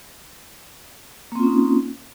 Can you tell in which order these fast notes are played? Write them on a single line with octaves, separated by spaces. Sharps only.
A#3 C4 F4 C#4 D#4